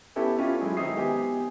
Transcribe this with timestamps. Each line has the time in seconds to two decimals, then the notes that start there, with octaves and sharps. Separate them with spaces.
0.16 B3 C#4 E4 G4 A4
0.38 C#4 E4 F4 G4
0.61 F#3 G#3 E4 G#4
0.77 D#3 C4 D#4 E5 D#6 C7
0.96 B3 G4 G#5